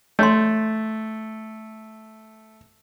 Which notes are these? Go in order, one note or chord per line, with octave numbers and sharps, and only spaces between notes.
A3 C#5 C6